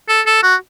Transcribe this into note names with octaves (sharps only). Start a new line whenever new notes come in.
A4
A4
F#4